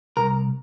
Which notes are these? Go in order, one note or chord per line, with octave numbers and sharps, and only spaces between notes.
C2 A#4